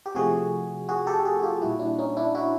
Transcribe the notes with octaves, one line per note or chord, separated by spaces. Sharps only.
G4
C3 F3 A3 F#4 G#4
F#4 G#4
G4 A4
F#4 G#4
F#4
F4 G4
A#2 G3 E4 F#4
D4 E4
C#4 D#4
D4 E4
E4 F#4